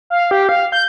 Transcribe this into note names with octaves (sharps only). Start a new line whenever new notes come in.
F5
G4
F5
G6